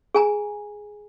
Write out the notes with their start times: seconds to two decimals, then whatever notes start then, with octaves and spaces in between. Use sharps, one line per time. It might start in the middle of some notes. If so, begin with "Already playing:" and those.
0.15 G#4 G#5 A#5